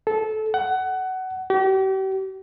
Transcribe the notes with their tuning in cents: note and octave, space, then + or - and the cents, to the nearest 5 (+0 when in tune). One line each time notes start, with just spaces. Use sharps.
A4 -20
F#5 +20
G4 -40